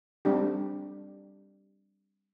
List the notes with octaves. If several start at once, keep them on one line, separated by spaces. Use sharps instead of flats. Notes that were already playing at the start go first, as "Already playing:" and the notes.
G3 C4 D4 G4